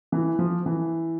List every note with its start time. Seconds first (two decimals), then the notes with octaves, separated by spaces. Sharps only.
0.12 E3
0.39 F3
0.66 E3